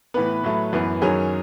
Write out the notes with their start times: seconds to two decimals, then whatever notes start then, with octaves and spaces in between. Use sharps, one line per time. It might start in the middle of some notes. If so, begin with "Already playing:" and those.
0.14 A2 E3 B3 B4
0.43 A2 F#3 A3
0.73 F#2 E3 B3
1.02 F#2 D#3 F#3 C#4 G#4